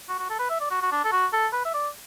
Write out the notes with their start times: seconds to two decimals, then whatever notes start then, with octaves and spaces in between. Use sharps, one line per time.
0.09 F#4
0.19 F#4
0.30 A4
0.39 B4
0.50 E5
0.61 D5
0.70 F#4
0.82 F#4
0.92 D4
1.04 A4
1.12 F#4
1.33 A4
1.53 B4
1.65 E5
1.74 D5